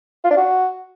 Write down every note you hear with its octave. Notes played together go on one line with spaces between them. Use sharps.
F4
D4
F#4